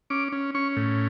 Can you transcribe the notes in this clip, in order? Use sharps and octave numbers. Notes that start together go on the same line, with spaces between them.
C#4 D6
C#4
C#4 C#6
A2